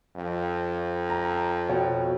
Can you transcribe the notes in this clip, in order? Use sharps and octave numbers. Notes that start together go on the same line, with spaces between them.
F2
A#5
B2 C#5 G5